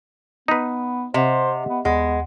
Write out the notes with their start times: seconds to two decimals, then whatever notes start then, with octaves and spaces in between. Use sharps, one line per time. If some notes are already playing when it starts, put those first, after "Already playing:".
0.48 B3 D#4 B4
1.14 C3 C5 D#5 E5 F#5
1.69 B3
1.85 D#2 G#3 B3 F#5